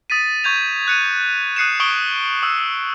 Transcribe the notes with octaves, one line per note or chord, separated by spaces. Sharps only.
D#6 A6 B6 D#7
C#6 G6 G#6 F7
F#6 C#7 D#7
D#6 F#6 C7 C#7 D#7 E7
C#6 D#6 D7 G7
D#6 E6